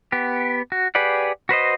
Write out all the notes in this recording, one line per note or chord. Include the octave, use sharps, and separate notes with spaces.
B3 G4
F#4
G4 G#4 B4 D5 F#5
F#4 B4 C5 D#5